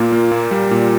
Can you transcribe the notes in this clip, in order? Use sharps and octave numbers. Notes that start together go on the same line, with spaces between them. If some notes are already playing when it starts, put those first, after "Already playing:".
Already playing: A#2 A#3 F4
A#3
A#2
G3
A#2